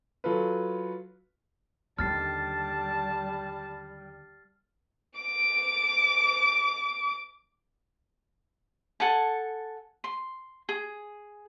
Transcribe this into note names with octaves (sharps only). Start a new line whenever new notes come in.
F#3 F4 A4 B4
D#2 D3 G3 A5 F6 A6 C7
D6 D7
A4 F#5 G#5 A5
C6
G#4